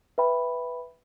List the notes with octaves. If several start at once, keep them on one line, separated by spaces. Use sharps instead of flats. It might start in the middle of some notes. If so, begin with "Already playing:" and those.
B4 E5 G5 B5